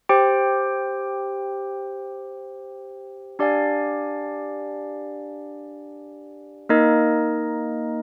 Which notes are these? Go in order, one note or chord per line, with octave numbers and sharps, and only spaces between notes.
G4 C5 G5
D4 G4 D5 F5 G#5
A#3 D#4 A#4 D#5